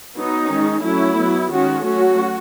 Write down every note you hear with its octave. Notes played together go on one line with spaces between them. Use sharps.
F#3 B3 D#4
D#3 G#3 C#4
F#3 A3 C#4 E4
F#3 B3
D#3 G#3 C#4 F#4
F#3 A3 C#4 F#4